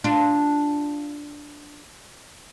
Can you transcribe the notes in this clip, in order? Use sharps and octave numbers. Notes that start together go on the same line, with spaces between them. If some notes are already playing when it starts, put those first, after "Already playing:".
D4 F4